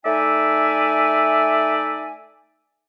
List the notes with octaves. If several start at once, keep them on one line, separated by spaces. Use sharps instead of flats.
A3 D#4 D5 E5 G#5